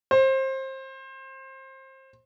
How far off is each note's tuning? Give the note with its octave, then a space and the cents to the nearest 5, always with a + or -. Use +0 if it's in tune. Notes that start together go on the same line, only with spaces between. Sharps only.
C5 +25